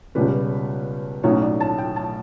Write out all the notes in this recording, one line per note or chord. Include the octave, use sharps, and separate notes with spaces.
C#2 B2 G3 C#4 B4
B1 A2 F#3 C#4 C#5
D5
A5
G5
A5